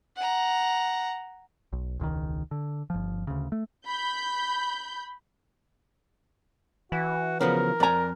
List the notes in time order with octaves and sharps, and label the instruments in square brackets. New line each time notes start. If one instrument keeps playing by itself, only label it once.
[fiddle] F#5 A#5
[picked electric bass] B1
E1 C#2 C3 D#3
D3
G1 F3
D2 C#3
A3
[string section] B5 G6
[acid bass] E3 [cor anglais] F#4
[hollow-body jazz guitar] C#3 F3 B3 [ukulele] F#4 [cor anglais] A#4
[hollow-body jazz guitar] F2 G#5 [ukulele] D5 A#5